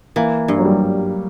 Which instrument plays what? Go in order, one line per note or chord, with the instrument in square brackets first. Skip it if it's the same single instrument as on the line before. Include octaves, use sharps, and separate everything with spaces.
[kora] E3 [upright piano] A#3
[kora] G2
[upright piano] F#3
G3